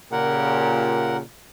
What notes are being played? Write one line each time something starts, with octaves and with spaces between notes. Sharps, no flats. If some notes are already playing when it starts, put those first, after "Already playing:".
A#2 C#3 G4 A#4 F#5